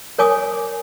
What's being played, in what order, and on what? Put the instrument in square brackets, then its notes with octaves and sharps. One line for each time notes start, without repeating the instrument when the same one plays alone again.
[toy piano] A#4 C#5 G#5 D6 D#6